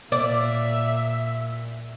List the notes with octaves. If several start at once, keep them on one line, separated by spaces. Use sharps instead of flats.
A#2 D5 E5